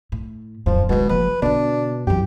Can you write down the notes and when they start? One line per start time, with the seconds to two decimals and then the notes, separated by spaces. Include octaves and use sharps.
0.12 A2
0.66 D1 G1 F2 F3
0.89 B2 D#3 G#3
1.09 F#1 F3 B4
1.42 B2 D3 B3 D4
2.07 F#2 E3 C4 G4